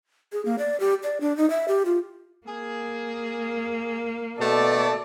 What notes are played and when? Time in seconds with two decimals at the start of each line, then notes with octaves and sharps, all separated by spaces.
0.32 G#4
0.45 A#3
0.58 D5
0.80 G4
1.03 D5
1.21 D4
1.37 D#4
1.50 E5
1.68 G4
1.85 F4
2.47 A#3 G#4
4.40 B2 A3 A4 D5 A5